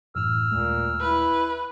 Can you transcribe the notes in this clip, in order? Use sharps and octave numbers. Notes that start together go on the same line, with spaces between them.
F#2 A2 E3 E6 F6
D#2 A#2 G#3 A3
E4 B4